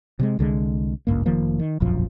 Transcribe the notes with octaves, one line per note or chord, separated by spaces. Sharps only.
C3 G3 G#3
C2 D3 D#3 G#3
G#1 C#2 G2 A#3
F1 D#3 F3 A#3
D#3
E1 A#1 F#2 F3